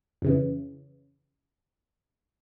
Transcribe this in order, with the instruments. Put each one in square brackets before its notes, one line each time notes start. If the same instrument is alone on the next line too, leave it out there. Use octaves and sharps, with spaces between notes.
[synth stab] F2 C#3 E3